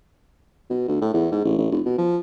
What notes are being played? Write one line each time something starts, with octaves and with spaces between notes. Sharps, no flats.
B2
D2
A2
E2
G#2
A1
A1
F1
B2
F3